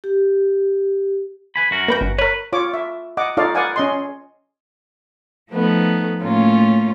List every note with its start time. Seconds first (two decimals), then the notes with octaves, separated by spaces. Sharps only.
0.04 G4
1.56 B4 G#5 B5
1.71 F#2 F#4 A#4
1.88 A#3 B4 G5
2.01 G1
2.18 A#4 B4 C#5
2.53 F4 C#5 D6
2.74 E5
3.17 D#5 F#5 D6
3.37 D#4 F4 A4 C#5 D5 F5
3.55 B4 D5 F5 F#5 G#5 D6
3.76 C#4 D#5 C6
5.50 F3 A3 B3 D#4
6.23 A2 A3 A#3 C#4 F4 C#5